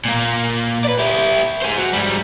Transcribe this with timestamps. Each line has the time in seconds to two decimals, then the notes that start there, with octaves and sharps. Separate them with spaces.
0.05 A#2 A#3
0.85 B4 D5
0.99 E4 G4
1.62 G#4 C5
1.77 F#3
1.93 G#2 G3